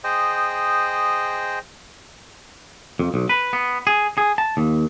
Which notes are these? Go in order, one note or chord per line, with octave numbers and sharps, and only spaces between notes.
G#4 C5 D#5 G5
F2
B1
B4
B3
G#4
G#4
A5
D#2